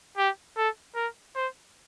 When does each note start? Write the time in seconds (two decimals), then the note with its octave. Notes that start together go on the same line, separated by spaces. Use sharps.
0.17 G4
0.57 A4
0.95 A#4
1.35 C5